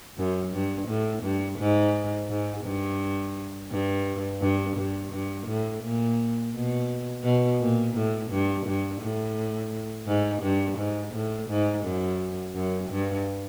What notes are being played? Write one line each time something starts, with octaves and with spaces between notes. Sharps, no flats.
F#2
G2
A2
G2
G#2
G#2
G2
G2
G2
G2
G2
A2
A#2
B2
B2
A#2
A2
G2
G2
A2
G#2
G2
G#2
A2
G#2
F#2
F#2
G2